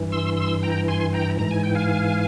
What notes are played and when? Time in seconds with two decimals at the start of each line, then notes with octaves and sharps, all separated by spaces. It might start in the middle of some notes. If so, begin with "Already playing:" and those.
Already playing: G2 E3
0.12 C6 E6
0.37 C6 E6
0.63 G5 A#5
0.88 G#5 C6
1.13 G5 A#5
1.39 G#2 E3 A#5
1.51 G#5
1.64 G5
1.75 F5 G#5